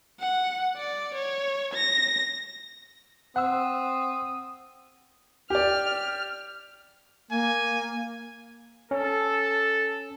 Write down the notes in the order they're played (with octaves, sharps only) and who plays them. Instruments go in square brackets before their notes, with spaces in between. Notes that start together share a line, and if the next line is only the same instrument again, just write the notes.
[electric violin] F#5
D5
C#5
A#6
[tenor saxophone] C4 [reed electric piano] F#5 E6 [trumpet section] D#6
[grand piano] G4 D5 [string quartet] F6
[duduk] A#3 [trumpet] G#5
[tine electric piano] C#4 [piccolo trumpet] A4